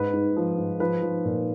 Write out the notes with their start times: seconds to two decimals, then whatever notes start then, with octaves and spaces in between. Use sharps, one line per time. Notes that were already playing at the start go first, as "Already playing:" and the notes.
Already playing: G#2 B4
0.13 G#2
0.37 F3
0.58 G#2
0.80 F3 B4
1.02 F3
1.25 A#2